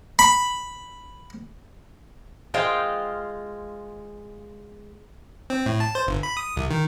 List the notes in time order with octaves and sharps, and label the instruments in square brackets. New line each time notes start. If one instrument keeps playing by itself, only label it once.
[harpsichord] B5
[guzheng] G#3 F4 C5 F5 G5
[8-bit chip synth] C4
A2
A5
C5
G1
B5
D#6
C2
D#3